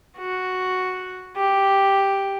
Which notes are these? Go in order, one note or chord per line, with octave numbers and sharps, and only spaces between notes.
F#4
G4